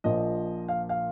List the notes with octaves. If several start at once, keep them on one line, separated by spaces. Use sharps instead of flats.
A#1 A#2 F3 D#5
F5
F5